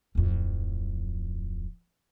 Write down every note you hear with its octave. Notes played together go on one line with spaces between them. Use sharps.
D1 F2